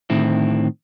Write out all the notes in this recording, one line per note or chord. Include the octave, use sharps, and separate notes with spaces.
A2 D3 D#3 C4 E4